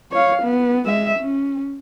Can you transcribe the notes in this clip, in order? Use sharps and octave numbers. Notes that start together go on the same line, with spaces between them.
C#5 F5
B3
G#3 E5
C#4